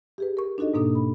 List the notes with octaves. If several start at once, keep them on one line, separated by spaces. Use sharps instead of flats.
G4 G#4 B4
A#4 C#6
D4 D#4 F#4 A4 D#5
G#2 B2 A#3 D4 A4 D#6
B5